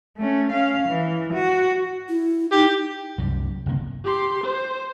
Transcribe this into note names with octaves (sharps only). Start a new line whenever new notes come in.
A3 C#4
C#4 F5
E3
F#4
E4
D#4 G4
C2 F#2 F#3 G3
G1 C3 A#3
G4 C6
C5